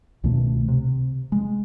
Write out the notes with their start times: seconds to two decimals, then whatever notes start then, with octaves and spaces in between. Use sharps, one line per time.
0.24 C#2 B2 D#3 A3
0.68 C3
1.32 G#3